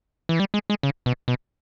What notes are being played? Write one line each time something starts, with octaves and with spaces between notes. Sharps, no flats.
E3
G3
G#3
G#3
C#3
B2
B2